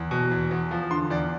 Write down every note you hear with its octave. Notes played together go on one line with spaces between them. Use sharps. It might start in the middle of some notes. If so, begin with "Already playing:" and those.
Already playing: E2
B2
E2
E2
F3
D3 C6
E2 D5